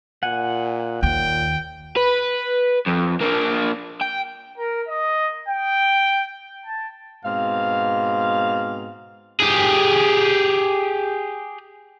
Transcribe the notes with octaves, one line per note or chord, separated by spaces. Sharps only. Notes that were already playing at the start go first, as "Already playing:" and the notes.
A#2 F#5 G#5
D#2 A#2 G5
B4
F2
A#3 D4
G5
A#4
D#5
G5
A5
G#2 B2 C4 F5
G4 G#4